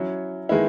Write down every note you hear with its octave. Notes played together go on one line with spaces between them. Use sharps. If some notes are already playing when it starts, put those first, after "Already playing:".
Already playing: F#3 C#4 E4
D#3 G#3 B3 E4